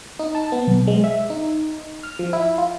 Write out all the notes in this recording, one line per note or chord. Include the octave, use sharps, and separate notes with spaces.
D#4
A5
B3
B1
G#3
E5
D#4
F6
F3
E4
F4